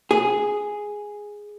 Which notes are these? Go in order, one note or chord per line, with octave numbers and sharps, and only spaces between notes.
G#4